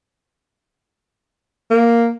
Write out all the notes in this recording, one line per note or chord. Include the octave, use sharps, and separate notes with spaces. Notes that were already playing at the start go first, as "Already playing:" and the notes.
A#3